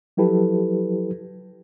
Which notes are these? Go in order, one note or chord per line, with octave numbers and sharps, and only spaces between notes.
F3 F#3 E4 G4 A4 B4